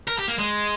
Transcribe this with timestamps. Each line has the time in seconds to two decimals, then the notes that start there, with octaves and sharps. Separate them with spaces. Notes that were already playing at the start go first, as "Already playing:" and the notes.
0.08 A#4
0.19 G4
0.28 A#3
0.38 G#3